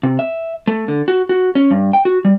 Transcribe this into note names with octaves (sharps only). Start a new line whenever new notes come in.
C3
E5
A3
D3
F#4
F#4
C#4
G2
G5
F#4
G3